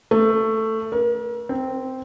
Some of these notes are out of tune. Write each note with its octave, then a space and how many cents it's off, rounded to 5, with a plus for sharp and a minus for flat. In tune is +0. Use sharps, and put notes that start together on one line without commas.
A3 +10
A#4 +40
C4 -5